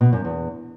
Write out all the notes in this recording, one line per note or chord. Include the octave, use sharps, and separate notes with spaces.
B2
F#2
E2